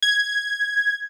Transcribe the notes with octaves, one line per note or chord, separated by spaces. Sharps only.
G#6